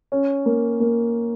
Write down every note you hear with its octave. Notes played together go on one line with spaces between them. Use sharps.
C#4
A#3
A#3